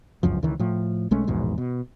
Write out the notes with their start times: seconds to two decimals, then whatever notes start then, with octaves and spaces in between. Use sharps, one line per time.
0.23 G1 C#2 F#2 F3
0.43 C#2 D#3 E3
0.59 A2 F3
1.11 B1 G#3 A3 C#4
1.27 A#1 E2 G#2 B2
1.58 B2